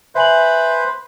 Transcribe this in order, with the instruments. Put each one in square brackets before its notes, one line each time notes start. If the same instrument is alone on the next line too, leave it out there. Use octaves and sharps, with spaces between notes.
[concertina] B4 C5 [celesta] E5 G#5 F#7